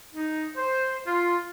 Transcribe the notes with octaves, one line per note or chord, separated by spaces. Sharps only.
D#4
C5
F4